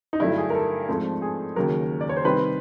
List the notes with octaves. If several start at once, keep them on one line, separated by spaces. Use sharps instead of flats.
D#4
G2 D3 F#3 A3 E4
G#4
A#4
A4
G#2 F3 A3 C4
G#4
D#2 C#3 F#3 A#4
D5
C#5
C5
C3 D#3 G3 C4 B4